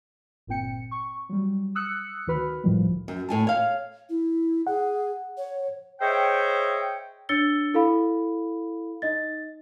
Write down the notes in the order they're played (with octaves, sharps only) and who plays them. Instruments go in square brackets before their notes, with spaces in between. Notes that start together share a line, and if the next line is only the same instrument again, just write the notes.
[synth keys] G1 A#2 C4 G5 C#7
C#6
F#3 G3
D#6 E6 F#6 C#7
D2 D#3 F#4 B4 B5 F6
G1 C#2 A2 D#3 F3 G3
[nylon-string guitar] F#2
A2 G#5 A5
C#5 F5
[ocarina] E4
[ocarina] G#4 [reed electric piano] F#5
[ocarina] C#5
[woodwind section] G#4 C5 C#5 D#5 E5 G5
[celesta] D4 C#5 E6 A6 C#7 G7
E4 A4 F5 B5
D#4 D#5 A6